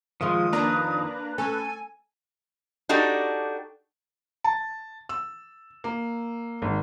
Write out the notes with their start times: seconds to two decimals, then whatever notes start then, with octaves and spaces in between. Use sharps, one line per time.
0.21 F2 D#3 F3 G#3 F4 D#6
0.53 A#3 D4 B4 A#5
1.38 C#4 A4 G#5
2.89 D4 D#4 F#4 G4 A4
4.44 A5
5.09 E6
5.84 A#3
6.62 G#1